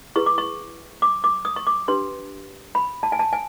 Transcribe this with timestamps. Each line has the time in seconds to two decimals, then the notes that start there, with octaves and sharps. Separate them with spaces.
0.16 E4 G#4 B4 C#6
0.26 D6
0.38 C#6
1.02 D6
1.24 D6
1.45 D#6
1.56 C#6
1.67 D6
1.88 D4 G4 B4 C6
2.75 B5
3.03 A5
3.12 G#5
3.19 A5
3.33 G#5